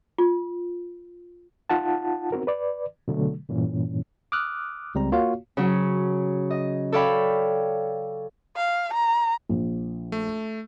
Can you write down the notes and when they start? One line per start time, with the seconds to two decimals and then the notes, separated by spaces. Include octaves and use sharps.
0.18 F4
1.70 D#4 F4 F#5 A5
2.32 B3 C4 D#4 F#4 A#4
2.47 B4 D5
3.08 B2 D3 F#3 A3
3.49 G2 A#2 E3 C#4
4.32 D6 D#6 F6 F#6
4.95 C#2 G3 C4 A#5
5.12 A#3 F4 F#4 C#5 F5
5.57 C#3 F#3 C#4
6.51 D#5
6.92 A4 C#5 D5 F5 G5 B5
8.56 F5
8.94 A#5
9.49 A#1
10.12 A3